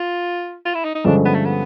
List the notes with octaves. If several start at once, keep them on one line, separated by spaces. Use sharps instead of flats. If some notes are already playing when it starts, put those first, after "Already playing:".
Already playing: F4
F4
E4
D#4
D#4
G2 D3 F3 G#3 C#4 D4
B3
A3
B3